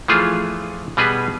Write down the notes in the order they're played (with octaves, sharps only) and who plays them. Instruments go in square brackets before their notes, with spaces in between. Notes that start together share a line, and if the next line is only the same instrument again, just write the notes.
[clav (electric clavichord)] E3 F3 A3 F4 G#4
B2 G3 B3 G#4 B4